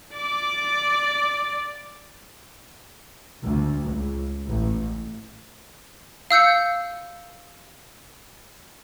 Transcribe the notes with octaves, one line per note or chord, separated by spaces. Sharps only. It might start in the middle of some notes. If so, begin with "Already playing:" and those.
D5 D6
D2
C#2
A1
F5 E6 G6 C#7